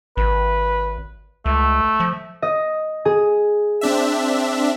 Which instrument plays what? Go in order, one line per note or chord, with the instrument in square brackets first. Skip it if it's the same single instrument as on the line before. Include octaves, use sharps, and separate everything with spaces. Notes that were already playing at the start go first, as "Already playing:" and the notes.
[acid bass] G#1 [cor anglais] B4
[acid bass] C#2 [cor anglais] A3
[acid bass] F3
[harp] D#5
G#4
[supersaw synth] C4 D4 E5